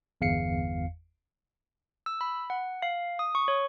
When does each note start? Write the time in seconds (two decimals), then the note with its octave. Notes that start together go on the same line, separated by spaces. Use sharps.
0.21 G1 E2 F5 C7 C#7
2.06 E6
2.21 B5
2.50 F#5
2.82 F5
3.19 D#6
3.35 C#6
3.48 C#5